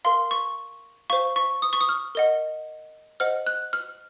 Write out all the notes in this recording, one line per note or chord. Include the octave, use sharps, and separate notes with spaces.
A#4 F5 C6
C#6
C5 F5 C#6
C#6
D#6
C#6
D#6
F6
A#4 D#5 F#5
C5 D#5 F#5 F6
F#6
F6